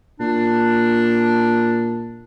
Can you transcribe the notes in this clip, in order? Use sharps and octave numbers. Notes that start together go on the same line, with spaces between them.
A#2 D4